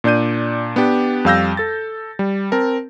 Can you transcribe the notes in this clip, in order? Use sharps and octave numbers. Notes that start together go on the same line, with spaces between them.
A#2 D4 D5 G6 D#7
B3 D4 G4
F2 G3 F5 E6 G6 A#6
A4 A6
G3
C4 A#4 A5